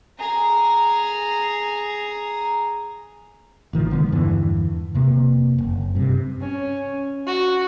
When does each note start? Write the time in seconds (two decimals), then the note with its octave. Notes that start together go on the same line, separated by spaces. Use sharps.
0.19 G#4 A#5
3.73 A1 D#3 F3
3.90 F1 D3 G#3 B3
4.12 E2 G2 D3 E3
4.94 F2 C3 A#3
5.58 F#1
5.95 G2 C3
6.41 C#4
7.27 F#4